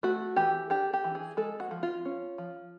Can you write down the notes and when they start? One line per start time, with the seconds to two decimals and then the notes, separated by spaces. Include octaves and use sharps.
0.03 A3 F#4
0.36 E3 G4
0.70 D4 G4
0.93 G4
1.04 E3
1.15 G#4
1.37 G#3 A4
1.60 F#4
1.71 F3
1.83 F4
2.05 C#4
2.38 F3